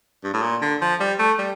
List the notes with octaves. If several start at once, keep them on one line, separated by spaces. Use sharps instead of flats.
G2
A2
A#2
D3
F3
G3
A3
G3